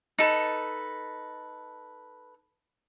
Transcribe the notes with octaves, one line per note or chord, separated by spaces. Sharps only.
D#4 A4 B4